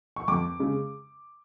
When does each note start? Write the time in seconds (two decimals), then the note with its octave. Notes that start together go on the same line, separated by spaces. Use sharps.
0.16 C#6
0.28 F2 D6
0.59 C#3 G#3